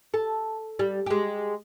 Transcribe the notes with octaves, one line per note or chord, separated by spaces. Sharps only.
A4
G3
G#3 G4